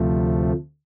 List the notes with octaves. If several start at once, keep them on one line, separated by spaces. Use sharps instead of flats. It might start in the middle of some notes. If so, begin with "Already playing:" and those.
Already playing: D2 C3 F3 A3